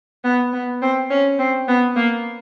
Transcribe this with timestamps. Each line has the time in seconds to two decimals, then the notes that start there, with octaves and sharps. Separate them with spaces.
0.24 B3
0.53 B3
0.82 C4
1.10 C#4
1.39 C4
1.68 B3
1.96 A#3